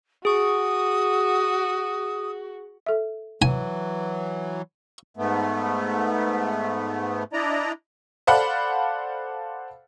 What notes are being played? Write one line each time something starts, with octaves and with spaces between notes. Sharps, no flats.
F#4 G#4 C#6 D#6
A4 E5
E3 F#3 G#5
G#2 A3 B3
D4 E4 D5 D#5 A#5
A4 C5 D5 F5 F#5 B5